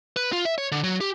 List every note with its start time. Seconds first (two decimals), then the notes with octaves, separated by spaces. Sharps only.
0.16 B4
0.33 F4
0.45 E5
0.58 C#5
0.72 D3
0.84 F#3
1.01 G4